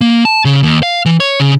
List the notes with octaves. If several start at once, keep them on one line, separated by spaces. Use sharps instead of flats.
A#3
A5
C#3
D#2
F5
E3
C#5
C#3